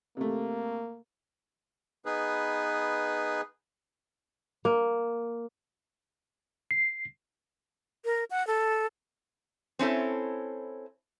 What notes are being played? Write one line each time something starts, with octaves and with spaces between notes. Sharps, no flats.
C3 A3 A#3
B3 D#4 G#4 B4
A#3
C7
A#4
F#5
A4
C4 C#4 E4 A4